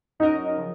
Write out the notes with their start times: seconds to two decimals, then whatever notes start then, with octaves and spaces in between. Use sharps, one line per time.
0.19 F#3 C#4 D#4 F#4 A#4 D#5
0.57 C#3 F3